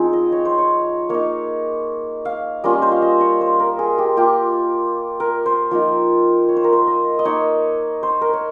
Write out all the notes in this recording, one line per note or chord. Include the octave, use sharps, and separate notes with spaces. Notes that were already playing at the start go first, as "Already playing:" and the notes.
Already playing: F3 C4 D#4 G#4
D#5
C#5
C5
C#5
A#3 D#4 C#5
F5
G3 A#3 C#4 F4 D#5
C5
F5
D#5
C#5
C5
A#4
G#4
G4
A#3 F4 G4
A#4
C5
F3 A#3 D#4
C#5
C5
A#4
C5
D#5
D#5
A#3 D#4 C#5
C5
A#4
C#5